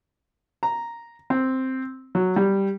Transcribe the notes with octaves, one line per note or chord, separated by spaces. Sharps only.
A#5
C4
F#3
G3